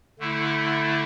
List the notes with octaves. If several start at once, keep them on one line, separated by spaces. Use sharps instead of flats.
D3 A3 E4